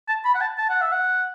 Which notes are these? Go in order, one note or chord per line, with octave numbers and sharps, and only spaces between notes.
A5
B5
F#5
A5
A5
F#5
E5
F#5